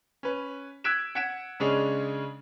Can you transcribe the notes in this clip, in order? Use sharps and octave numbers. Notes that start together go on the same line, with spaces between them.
C#4 B4
E6 F#6 G#6 B6 D7 E7
F#5 G#6 B6 D7 E7
C#3 G#3 C#4 D4 G#4